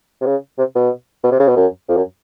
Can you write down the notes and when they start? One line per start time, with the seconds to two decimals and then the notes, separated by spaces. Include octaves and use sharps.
0.21 C3
0.26 C#3
0.58 C3
0.75 B2
1.24 B2
1.32 C3
1.40 C#3
1.48 B2
1.56 F#2
1.89 F2
1.97 F#2